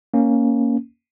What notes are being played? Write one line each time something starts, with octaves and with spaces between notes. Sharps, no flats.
A#3 C#4